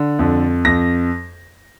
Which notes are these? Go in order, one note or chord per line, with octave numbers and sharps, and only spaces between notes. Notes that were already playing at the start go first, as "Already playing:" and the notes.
Already playing: D3
F2
F2 A#6